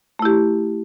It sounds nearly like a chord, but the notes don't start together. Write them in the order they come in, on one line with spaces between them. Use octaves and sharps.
A3 E4 G4